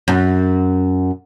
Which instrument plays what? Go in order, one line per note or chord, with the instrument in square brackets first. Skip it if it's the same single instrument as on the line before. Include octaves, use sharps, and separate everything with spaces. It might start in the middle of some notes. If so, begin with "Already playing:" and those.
[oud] F#2